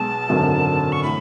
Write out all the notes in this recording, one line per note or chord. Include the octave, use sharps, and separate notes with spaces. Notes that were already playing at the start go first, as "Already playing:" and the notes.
Already playing: B1 B2 G#3 A5
G#1 F#2 D3 F#3
C#6
A2 E3 B5